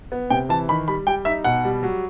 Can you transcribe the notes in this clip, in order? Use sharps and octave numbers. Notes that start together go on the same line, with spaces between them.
B3
C3 G5
E3 A5
D#3 B5
G3 B5
G3 G5
D#4 E5
B2 F#5
G3
F#3